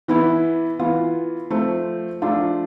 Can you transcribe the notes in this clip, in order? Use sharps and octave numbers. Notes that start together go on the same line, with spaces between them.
E3 B3 E4
E3 B3 F4
F3 A3 C4
F3 A3 D4 F4